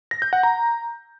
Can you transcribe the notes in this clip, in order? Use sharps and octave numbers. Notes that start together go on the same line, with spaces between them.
A#6
G6
F#5
A#5